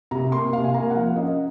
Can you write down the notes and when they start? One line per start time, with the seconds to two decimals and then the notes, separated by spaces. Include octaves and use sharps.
0.11 C3 A#5
0.32 A#3 C6
0.53 C3 F5
0.64 G#5
0.74 A#3 A#5
0.90 F#5
0.95 F3 F5
1.16 C#4 D#5